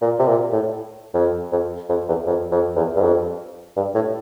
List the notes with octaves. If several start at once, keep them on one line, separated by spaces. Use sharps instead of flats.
A#2
C3
A#2
A2
F2
F2
F2
E2
F2
F2
E2
G2
F2
G2
A2